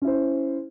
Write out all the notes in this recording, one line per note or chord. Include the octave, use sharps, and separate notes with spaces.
C#4 E4 C5